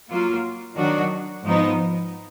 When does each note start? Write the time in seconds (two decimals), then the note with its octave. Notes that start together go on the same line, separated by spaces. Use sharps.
0.10 F#3 A#3 F4
0.77 D#3 F#3 D4 F#4
1.44 G#2 F3 B3 D#4